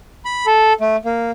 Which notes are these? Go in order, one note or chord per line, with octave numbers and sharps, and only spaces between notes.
B5
A4
A3
A#3